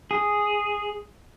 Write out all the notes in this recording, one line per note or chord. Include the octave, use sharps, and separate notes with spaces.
G#4